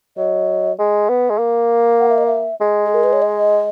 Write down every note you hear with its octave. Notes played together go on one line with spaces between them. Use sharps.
F#3 D#5
G#3
B3
G#3
A#3
F#5
E5
D#5
E5
G#3
G#4
A#4
B4
C#5
D#5